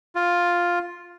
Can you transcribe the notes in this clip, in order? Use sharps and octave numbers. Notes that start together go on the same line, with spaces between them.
F4